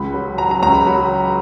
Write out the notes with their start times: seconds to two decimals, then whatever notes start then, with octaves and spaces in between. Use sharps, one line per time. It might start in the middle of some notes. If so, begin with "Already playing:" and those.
Already playing: C#2 B5
0.14 F#3
0.38 F#3 A#5
0.51 A#5
0.63 C#2 A#5
0.75 B5
0.87 F#3